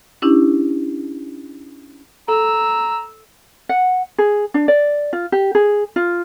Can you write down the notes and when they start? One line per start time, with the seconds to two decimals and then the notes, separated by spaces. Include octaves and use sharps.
0.22 C#4 D4 E4 G4
2.28 A4 A#5 E6
3.69 F#5
4.18 G#4
4.54 D4
4.68 D5
5.13 F4
5.32 G4
5.55 G#4
5.96 F4